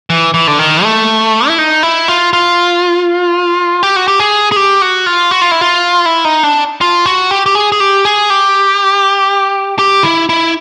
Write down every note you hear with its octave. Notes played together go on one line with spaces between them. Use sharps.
E3
E3
D3
D#3
A3
E4
D#4
E4
F4
F4
G4
F#4
G4
G#4
G#4
G4
F#4
F4
F#4
F4
E4
F4
E4
D#4
D4
F4
F#4
G4
G4
G#4
G#4
G4
G#4
G4
G4
E4
E4